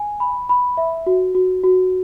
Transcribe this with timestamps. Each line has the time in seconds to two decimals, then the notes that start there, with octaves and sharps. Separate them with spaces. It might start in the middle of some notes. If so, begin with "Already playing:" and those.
Already playing: G#5
0.20 B5
0.49 B5
0.77 E5
1.06 F#4
1.35 F#4
1.64 F#4